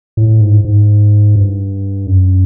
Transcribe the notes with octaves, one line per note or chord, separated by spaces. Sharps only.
A2
G#2
G#2
G2
F#2